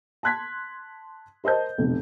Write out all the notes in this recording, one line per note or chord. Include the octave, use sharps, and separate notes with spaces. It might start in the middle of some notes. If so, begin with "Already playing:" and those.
A5 C6 F#6 G#6 B6
A#4 C5 D#5 A5 G6
F1 B1 F2